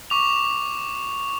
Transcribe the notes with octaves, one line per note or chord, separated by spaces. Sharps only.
C#6 D6 F7